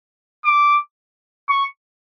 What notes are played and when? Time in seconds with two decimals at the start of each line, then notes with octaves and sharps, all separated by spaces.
0.45 D6
1.49 C#6